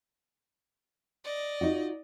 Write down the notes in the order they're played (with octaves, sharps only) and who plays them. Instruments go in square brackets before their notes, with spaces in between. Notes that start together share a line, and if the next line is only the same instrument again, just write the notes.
[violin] D5 D#5
[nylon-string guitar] D#4 F4 F#4